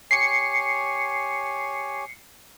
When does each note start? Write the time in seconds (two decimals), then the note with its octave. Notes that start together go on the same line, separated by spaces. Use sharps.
0.11 G4 C#5 G#5 C7 C#7